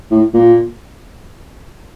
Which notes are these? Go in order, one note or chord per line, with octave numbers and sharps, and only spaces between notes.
A2
A#2